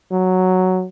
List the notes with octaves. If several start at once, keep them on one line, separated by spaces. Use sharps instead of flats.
F#3